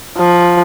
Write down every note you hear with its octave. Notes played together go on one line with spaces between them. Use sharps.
F3